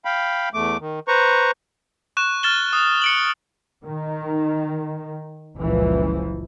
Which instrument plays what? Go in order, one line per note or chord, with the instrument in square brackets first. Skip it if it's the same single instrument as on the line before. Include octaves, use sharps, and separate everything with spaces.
[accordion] F5 G5 B5
E2 A3 D6
D#3
B4 C5 A#5 C#6
[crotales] C#6 F#6 E7
F6 A6 E7 G7
D#6
C#7 D7 F#7
[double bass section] D#3
F#1 C#2 A#2 E3 F3